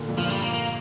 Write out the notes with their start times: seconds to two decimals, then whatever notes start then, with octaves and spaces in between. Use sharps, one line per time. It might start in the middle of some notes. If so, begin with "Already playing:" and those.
Already playing: A#2 D3
0.09 F2 G#2
0.18 G2 A#2 F3
0.30 G3
0.42 A#3
0.54 A#3